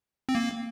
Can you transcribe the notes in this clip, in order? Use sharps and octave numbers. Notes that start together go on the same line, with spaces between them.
C4
A#3